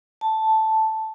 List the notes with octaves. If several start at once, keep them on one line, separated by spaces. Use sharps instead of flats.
A5